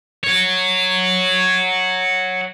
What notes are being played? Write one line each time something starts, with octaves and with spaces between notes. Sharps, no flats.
C#5 F#5